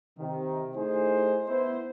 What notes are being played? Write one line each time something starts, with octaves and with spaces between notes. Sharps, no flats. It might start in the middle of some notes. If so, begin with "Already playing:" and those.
C3 D#3
A3 D#4 E4 G#4 C5
B3 E4 C5